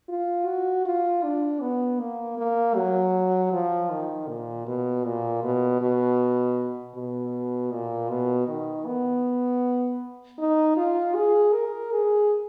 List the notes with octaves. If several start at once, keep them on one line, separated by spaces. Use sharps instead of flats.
F4
F#4
F4
D4
B3
A#3
A#3
F#3
F3
D#3
A#2
B2
A#2
B2
B2
B2
A#2
B2
D#3
B3
D#4
F4
G#4
A#4
G#4